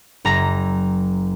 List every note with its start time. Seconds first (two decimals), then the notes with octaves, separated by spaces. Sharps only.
0.25 F#1 A#5 A#6